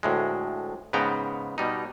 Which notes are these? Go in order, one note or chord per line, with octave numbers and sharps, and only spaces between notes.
D2 A2 G#3
G#2 C#3 B3 G5 A#5
B2 G3 D#4